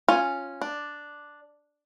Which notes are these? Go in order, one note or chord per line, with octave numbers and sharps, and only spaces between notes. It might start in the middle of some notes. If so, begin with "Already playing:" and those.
C#4 F4 G#5
D4